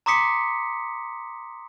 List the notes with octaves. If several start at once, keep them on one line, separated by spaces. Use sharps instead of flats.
A#5 C6 D6 D#6 B6 C#7